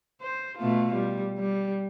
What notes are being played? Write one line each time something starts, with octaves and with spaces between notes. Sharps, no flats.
C5
B2 A3 F4
G3
G3